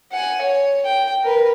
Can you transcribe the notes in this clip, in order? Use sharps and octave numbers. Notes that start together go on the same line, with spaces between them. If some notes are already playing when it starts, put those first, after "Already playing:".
F#5 G#5
C#5
G5
A#4 B4